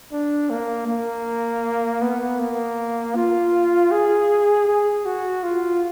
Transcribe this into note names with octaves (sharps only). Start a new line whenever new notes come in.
D4
A#3
A#3
B3
A#3
F4
G#4
G#4
F#4
F4